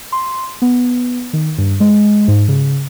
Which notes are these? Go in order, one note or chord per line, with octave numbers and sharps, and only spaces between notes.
C6
B3
D#3
G2
G#3
G#2
C#3